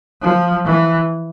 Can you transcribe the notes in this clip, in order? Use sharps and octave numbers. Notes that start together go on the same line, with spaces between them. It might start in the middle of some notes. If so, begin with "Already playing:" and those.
F3
E3